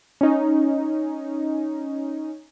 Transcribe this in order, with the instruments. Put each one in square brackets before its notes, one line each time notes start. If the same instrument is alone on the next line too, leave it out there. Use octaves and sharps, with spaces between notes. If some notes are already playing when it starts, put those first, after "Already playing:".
[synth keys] C#4 D#4